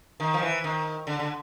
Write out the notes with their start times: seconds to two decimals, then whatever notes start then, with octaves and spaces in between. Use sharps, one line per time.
0.20 D#3
0.34 F3
0.42 E3
0.64 D#3
1.07 D3
1.19 D3